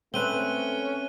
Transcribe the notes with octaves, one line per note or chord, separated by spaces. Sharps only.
A3 C4 C#4 B4 F#6 D#7 G7